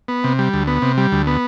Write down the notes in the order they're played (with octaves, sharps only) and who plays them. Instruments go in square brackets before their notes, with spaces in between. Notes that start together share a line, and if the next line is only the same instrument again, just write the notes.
[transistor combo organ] B3
C3
G3
D2
B3
C3
G3
D2
B3